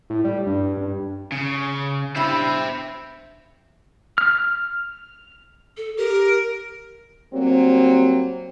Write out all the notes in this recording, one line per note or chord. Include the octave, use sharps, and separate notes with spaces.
A2
G3
G2
G2
C#3
G2 E4 C5 E5
F6
A4
G4 A#4
F#3 G3 A#3 C4